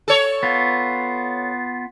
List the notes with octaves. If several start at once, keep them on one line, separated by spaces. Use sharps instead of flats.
A4 C#5
B3 F4